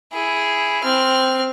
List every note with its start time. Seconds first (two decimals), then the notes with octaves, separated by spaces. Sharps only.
0.13 E4 G#4
0.84 C4 F6